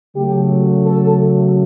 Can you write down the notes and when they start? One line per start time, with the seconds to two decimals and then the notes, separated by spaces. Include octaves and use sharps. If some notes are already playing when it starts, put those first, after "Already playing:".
0.14 C#3 F#3 A3 G4
0.86 A4